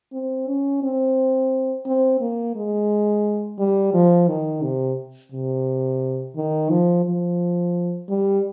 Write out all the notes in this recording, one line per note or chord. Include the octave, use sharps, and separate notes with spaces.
C4
C#4
C4
C4
A#3
G#3
G3
F3
D#3
C3
C3
D#3
F3
F3
G3